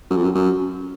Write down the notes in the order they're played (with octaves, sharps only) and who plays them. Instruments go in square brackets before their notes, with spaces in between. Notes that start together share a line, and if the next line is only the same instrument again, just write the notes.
[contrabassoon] F#2
F2
F#2
F#2